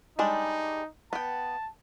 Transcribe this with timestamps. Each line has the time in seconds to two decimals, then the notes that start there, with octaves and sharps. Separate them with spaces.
0.19 G3 G#3 D4 D#4
1.13 B3 G5 A5